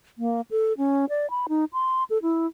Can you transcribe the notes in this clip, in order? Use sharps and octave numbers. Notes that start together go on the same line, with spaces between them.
A#3
A4
C#4
D5
B5
D#4
C6
A4
E4